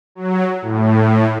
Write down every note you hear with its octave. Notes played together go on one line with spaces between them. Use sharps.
F#3
A2